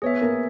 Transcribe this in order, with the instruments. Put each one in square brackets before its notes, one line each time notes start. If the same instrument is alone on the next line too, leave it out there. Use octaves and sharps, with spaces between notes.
[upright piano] B3 [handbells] G#4 C#5 E5
[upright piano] A#3